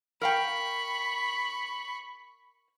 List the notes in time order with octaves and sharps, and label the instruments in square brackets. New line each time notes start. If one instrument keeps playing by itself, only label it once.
[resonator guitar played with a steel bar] A#4 F5 G5 [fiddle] B5 C#6